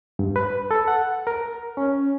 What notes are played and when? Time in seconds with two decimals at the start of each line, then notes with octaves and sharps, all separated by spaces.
0.19 G2
0.36 B4
0.71 A4
0.88 F#5
1.27 A#4
1.77 C#4